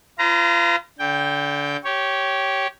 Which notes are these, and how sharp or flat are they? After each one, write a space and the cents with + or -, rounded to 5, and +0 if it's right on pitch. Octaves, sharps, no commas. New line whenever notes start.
F4 -30 B4 +45 A#5 +0
D3 -30 G5 +0
G4 -15 C#5 +0